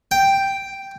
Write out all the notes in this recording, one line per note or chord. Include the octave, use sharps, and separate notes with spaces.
G5